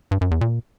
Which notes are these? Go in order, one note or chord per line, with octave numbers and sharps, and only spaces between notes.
G2
F#2
E2
A#2